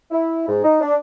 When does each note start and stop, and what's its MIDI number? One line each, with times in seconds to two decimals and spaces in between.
0.11 0.46 64
0.48 0.60 44
0.64 0.78 63
0.81 0.95 62